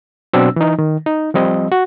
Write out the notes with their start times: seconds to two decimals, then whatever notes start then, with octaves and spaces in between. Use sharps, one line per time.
0.33 B2 F#3 C4 D4 E6
0.56 E3 D#4
0.79 D#3
1.06 D#4
1.34 F3 G3 C4 D#5
1.72 F#4